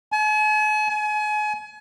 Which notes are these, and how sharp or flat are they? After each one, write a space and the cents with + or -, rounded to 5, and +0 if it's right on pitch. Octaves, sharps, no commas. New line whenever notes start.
G#5 +45
G#5 +35